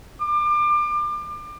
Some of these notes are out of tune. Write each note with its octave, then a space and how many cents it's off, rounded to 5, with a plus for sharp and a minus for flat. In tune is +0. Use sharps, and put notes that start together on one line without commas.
D6 +30